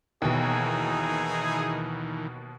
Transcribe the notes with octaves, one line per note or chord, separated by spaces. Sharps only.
D#2 B2 D#3 E3 D#4 E4 G#4